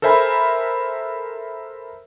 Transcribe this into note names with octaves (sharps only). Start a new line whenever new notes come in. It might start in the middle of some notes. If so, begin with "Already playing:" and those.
A4 A#4 C5 E5 G#5 B5